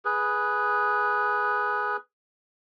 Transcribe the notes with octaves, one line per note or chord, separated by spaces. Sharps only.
G#4 B4